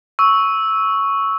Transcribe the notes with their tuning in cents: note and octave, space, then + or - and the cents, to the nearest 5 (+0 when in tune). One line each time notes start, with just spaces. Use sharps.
C#6 +5 E6 -10